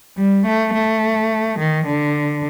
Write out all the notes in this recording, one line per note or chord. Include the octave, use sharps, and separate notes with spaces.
G3
A3
A3
D#3
D3